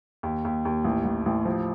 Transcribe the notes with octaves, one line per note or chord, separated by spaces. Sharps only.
D#2
D#2
D#2
A1
A1
A1
F3